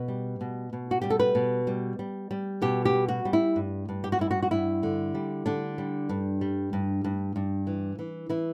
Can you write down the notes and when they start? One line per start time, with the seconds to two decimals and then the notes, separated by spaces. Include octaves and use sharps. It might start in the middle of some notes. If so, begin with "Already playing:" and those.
Already playing: B2 B4
0.08 G3
0.41 B2
0.73 B2
0.91 F#4
1.01 G3 G4
1.10 A4
1.19 B4
1.35 B2
1.67 G3
1.99 G3
2.31 G3
2.62 B2 G4
2.85 G4
2.93 G3
3.08 F#4
3.25 G3
3.33 E4
3.56 G2
3.89 G2
4.04 G4
4.12 F#4
4.19 G2 E4
4.31 F#4
4.43 F#4
4.51 G2 E4
4.83 D3
5.15 G3
5.46 D3 D4
5.78 G3
6.09 G2
6.41 G3
6.73 G2
7.04 G2
7.36 G2
7.67 E3
7.99 E3
8.29 E3 E4